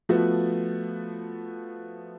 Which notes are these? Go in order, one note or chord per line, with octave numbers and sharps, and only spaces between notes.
F3 A3 B3 F#4